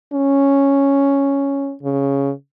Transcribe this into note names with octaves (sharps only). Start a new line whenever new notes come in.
C#4
C#3